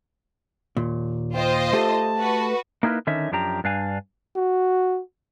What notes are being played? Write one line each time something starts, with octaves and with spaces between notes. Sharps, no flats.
D#2 A#2
F4 C5 D#5 G5
A3 G4 A4 A5
F#4 B4
A#3 D#4 E4 F#4 A#4 B4
D3 D#3 C#4 D#4 E5
F#2 F3 D4 G4 A#5
G2 D4 F5 G#5
F#4